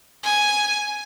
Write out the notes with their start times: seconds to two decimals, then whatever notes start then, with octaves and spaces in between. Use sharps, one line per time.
0.23 G#5